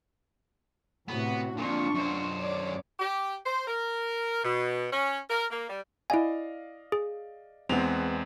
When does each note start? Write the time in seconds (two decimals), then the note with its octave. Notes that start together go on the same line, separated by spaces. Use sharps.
1.08 A2 C3 B3 F#4
1.57 F2 A#2 D4 F4 C#6
1.95 F#2 C5
2.39 C#5 D5 D6
2.99 G4
3.46 C5
3.67 A#4
4.44 B2
4.92 C#4
5.29 A#4
5.50 A#3
5.69 G3
6.10 E4 D5 D#5 F5 G#5
6.92 G#4
7.69 E2 G#3 B3 C4 F7